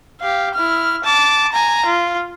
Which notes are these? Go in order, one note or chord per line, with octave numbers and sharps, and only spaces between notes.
G4 F5
E4 F6
A5 D6
G#5 A#5
F4